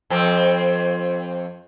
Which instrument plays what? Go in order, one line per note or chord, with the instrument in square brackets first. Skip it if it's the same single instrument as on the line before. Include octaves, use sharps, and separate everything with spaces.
[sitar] F2 C4